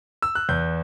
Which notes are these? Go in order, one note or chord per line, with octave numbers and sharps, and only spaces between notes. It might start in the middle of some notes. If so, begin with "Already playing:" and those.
E6
F#6
E2 G6